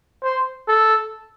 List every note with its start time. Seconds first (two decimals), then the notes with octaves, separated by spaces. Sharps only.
0.23 C5
0.68 A4